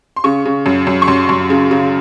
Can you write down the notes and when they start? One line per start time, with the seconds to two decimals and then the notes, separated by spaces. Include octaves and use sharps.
0.16 C6
0.24 C#3 C#6
0.45 C#3
0.66 F#2
0.87 F#2
1.02 C#6
1.08 F#2 C6
1.29 F#2
1.50 C#3
1.71 C#3